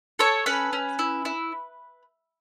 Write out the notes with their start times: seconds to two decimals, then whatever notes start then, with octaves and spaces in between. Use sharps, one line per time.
0.19 A4 C#5
0.46 C#4 B4
0.73 C#4
0.99 E4
1.25 E4